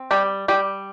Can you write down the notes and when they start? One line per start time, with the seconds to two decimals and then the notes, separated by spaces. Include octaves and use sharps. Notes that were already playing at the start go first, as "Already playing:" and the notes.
Already playing: C4
0.11 G3 G4
0.48 G3 G4